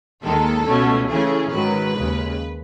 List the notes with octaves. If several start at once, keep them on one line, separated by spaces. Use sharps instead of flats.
D#2 D#3 G#3 A4
C#2 B2 A3 C#4
C#3 E3 A3 C#4 G#4
G#2 D#3 F#3 B4
D#2 C#3 G#3